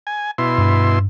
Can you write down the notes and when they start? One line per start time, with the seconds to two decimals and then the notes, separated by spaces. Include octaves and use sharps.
0.07 G#5
0.38 B2 E4 C6
0.58 G2